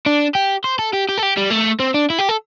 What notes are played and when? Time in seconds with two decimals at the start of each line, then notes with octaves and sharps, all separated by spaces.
0.06 D4
0.35 G4
0.64 C5
0.79 A4
0.93 G4
1.09 G4
1.18 A4
1.23 G4
1.37 G3
1.51 A3
1.80 C4
1.94 D4
2.10 E4
2.19 G4
2.29 A4